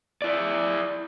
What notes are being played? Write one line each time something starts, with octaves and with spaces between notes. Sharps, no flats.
E4 D5